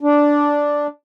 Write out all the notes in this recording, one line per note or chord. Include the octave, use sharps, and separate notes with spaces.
D4